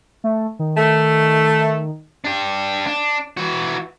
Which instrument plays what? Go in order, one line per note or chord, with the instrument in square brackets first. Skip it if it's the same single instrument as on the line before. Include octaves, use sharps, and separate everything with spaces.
[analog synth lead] A3
D#3
[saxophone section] A3
[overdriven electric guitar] D4 G4
D4
E3 F#4